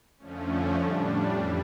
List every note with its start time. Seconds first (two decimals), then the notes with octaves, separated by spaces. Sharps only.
0.18 F2 D3 F3 A3 C#4
0.74 A2 G3 D4
1.30 F2 E3 G3